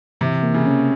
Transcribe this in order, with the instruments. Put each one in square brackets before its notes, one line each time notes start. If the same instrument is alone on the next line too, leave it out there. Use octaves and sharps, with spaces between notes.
[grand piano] C3 [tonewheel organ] E3
[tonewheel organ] A#3
[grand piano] C#3
[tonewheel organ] C#4